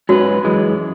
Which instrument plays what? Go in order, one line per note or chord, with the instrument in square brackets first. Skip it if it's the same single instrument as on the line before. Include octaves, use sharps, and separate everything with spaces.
[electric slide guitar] G#2 F#3 C#4 G#4 B4 [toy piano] F#4
[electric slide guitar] F#2 E3 G#3